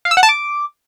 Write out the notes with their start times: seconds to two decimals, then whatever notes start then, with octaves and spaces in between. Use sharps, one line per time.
0.05 F5
0.11 E6
0.17 F#5
0.23 A5
0.29 D6